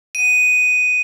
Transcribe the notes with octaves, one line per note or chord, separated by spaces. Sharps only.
D#7